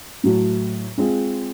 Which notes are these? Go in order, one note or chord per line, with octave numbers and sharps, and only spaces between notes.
A2 F#3 A3
G#3 C4 F4 G#4